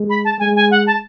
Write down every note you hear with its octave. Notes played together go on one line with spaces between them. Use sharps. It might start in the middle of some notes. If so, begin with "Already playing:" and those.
Already playing: G#3
B5
A5
G#3 G#5
G#5
F#5
A5